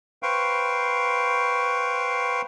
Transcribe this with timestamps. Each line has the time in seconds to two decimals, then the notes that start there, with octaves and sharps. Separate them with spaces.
0.23 B4 C5 F5 G5 C#6